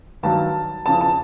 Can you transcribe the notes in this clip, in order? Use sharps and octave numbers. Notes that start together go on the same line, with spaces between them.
G2 D#3 F#3 A5
E2 C#3 F3 A5
A5